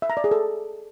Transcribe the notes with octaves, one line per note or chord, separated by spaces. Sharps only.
E5
A#5
D5
G#4
A4